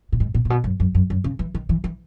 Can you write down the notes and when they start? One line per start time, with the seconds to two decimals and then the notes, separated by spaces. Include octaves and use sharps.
0.12 A#2
0.20 G#2
0.34 A#2
0.45 A#2
0.50 B2
0.64 F#2
0.80 F#2
0.95 F#2
1.10 F#2
1.24 C#3
1.39 E3
1.55 D#3
1.69 E3
1.84 E3